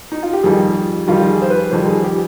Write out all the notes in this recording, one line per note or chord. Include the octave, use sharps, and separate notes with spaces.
D#4
F4
G4
F2 D#3 G3 G#4
F2 D#3 G3 F4
G#4
C5
B4
F2 D#3 G3 C5
G#4
G4